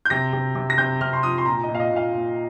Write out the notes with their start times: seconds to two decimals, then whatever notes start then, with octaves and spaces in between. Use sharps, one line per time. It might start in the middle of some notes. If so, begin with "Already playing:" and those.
0.05 G6
0.10 C3 A#6
0.33 C3
0.55 C3
0.70 A#6
0.78 C3 G6
1.01 C3 F6
1.13 C6
1.23 F3 D#6
1.38 C6
1.45 A#2 A#5
1.63 D#5
1.68 A#2
1.74 F5
1.80 D#5
1.91 A#2
1.96 F5
2.13 A#2